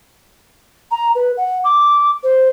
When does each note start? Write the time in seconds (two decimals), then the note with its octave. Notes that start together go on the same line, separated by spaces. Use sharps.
0.91 A#5
1.15 B4
1.37 F#5
1.64 D6
2.23 C5